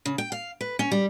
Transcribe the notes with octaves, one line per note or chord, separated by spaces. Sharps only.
C#3
G5
F5
B4
C#4
G3